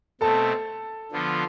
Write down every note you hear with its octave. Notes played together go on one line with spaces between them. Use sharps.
B2 A3 C4 A4 A5
D3 F3 B3 F4